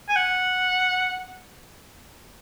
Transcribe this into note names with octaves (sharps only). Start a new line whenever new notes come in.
G#5
F#5